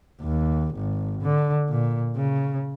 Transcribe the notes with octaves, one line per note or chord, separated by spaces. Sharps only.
D#2
G#1
D3
A#2
C#3